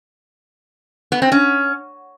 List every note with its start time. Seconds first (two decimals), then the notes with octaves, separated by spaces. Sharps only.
1.12 B3
1.22 C4
1.32 C#4